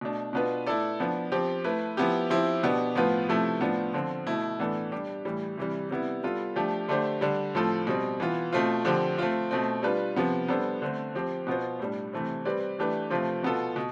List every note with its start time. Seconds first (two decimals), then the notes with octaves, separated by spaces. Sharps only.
0.01 B2 A3 D4
0.33 B2 B3 D4 F4 B4
0.67 A3 E4 A4 D5
1.00 F3 B3 D4
1.32 F3 C4 G4
1.64 A3 E4 B4
1.97 F3 B3 E4 G4
2.30 F3 C4 E4 G4 C5
2.63 B2 B3 D4 G4
2.95 A2 F3 B3 F4 B4
3.29 C3 F3 A3 E4 A4
3.61 A2 F3 B3 D4 F4
3.93 D3 F3 C4
4.27 B2 A3 E4
4.59 A2 E3 B3 D4 A4
4.92 G3 D4 G4
5.25 A2 E3 G3
5.57 C3 E3 G3
5.90 C3 G3 B3 E4
6.24 G3 B3 F4 A4
6.56 F3 A3 D4 G4
6.88 D3 A3 D4 G4 C5
7.21 D3 G3 D4
7.55 A2 F3 C4 F4 A4
7.87 B2 G3 C4
8.20 E3 B3 F4
8.52 B2 A3 C4 F4 C5
8.85 D3 F3 C4 G4
9.18 A3 C4 F4
9.51 B2 A3 C4
9.83 G3 D4 F4 B4
10.16 C3 F3 B3
10.48 G3 B3 D4 A4 C5
10.82 D3 A3 C4
11.15 F3 C4 G4 C5
11.47 B2 B3 F4 C5
11.79 A2 G3 D4
12.13 C3 E3 A3 C4
12.45 G3 C4 G4 B4 D5
12.79 E3 A3 D4 G4 B4
13.10 C3 F3 A3 C4 F4
13.43 B2 B3 F4 A4
13.76 B2